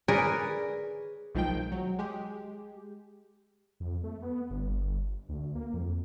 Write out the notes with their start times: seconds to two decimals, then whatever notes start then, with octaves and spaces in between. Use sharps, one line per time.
0.08 G#4 A#4 B4 C#5 D5 G#5
1.35 B1 D#3 F3 G#3 G5
1.72 F#3
1.99 G#3 G4
3.80 F2
4.04 A3
4.22 B3
4.50 G1
5.29 D2
5.55 A#3
5.73 F2